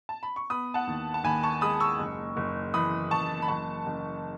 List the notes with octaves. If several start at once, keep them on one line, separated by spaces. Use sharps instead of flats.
A5
B5
C#6
B3 B5 D#6
F#5 A5
D#2
A5
D#2 G#5 B5
A5 C#6
G#3 B5 D#6
C#6 E6
F#1
F#1
E3 B5 D#6
F#1 A5 C#6
B5
F#1 A5 C#6
F#1